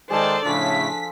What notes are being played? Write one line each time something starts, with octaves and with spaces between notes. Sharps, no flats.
D#3 G#3 G#4 A4 C5 D5 A5
A2 C#3 F3 D4 B6